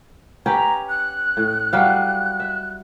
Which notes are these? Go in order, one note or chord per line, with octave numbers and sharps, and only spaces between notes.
C#4 G4 B4 A#5
F#6
A2
F#3 G3 F5
E5